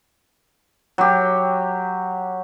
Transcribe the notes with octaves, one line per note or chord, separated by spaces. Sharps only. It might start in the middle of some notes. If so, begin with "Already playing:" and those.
F#3 G4